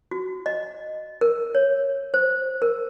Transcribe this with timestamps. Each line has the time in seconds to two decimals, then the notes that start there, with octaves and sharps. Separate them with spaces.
0.11 F#4
0.46 D#5
1.21 A#4
1.55 C#5
2.14 C5
2.62 A#4